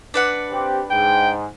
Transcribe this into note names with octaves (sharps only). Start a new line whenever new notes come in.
D4 B4 F#5
C4 G4
G#2 G5